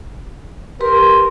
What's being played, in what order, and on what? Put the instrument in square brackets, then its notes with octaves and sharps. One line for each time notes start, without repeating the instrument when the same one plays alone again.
[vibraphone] G4 B4 C6 [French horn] A#4